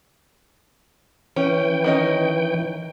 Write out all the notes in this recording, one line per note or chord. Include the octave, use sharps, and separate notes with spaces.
E3 C#4 G5
D#3 C#4 D#5